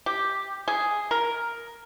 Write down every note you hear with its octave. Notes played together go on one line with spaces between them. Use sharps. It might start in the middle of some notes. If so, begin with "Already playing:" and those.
G4
G#4
A#4